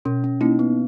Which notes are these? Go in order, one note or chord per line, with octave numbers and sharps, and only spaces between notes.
B2 C#4
C#4
A#3 C#4 D#4 E4
B3